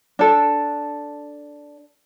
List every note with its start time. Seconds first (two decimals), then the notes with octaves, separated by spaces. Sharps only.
0.19 D4 A4